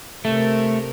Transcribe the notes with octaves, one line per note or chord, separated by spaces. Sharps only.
C3 A3 A#4